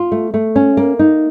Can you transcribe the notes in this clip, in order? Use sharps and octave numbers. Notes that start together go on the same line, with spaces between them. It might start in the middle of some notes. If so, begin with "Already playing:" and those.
Already playing: F4
A3
A3
C#4
A#3
D#4